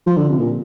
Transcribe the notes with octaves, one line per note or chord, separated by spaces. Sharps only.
F3
D3
C3
A#2